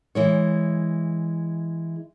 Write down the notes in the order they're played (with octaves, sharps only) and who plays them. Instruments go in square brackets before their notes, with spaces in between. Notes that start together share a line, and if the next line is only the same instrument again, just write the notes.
[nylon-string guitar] E3 G#3 C#5